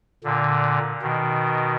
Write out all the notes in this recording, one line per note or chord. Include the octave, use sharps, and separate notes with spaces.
A#2 D3
B2 D#3